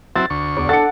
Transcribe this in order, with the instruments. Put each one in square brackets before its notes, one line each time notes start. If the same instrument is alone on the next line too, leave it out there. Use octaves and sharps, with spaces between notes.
[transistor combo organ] F#3 C4 E4 [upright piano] A6
[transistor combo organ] D2 C#6
[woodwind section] E2 [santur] D5
[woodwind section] D4 A4 [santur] F#5 [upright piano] A6 C#7